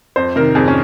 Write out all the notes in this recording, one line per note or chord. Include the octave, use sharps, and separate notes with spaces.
F2 C5
C3 D#3 A#4
F2 G#4
C#4